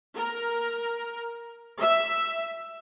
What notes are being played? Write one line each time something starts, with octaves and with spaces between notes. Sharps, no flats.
A#4
E5